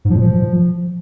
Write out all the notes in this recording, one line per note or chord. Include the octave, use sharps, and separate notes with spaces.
G#2
F3
A#2
F3